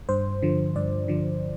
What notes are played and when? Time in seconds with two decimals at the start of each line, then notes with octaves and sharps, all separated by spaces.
0.09 G2 C5
0.42 D3 F3
0.76 G2 D5
1.08 D3 F3